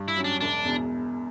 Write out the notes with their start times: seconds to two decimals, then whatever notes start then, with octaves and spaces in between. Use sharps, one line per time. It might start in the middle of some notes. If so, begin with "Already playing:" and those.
Already playing: G2
0.08 E4
0.16 F#3 C#4
0.24 D4
0.41 E1 D4
0.65 E2 B2